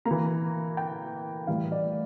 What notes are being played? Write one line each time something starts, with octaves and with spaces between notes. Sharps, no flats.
A#3 A#5
E3
G5
A2 E3 G3 F5
D5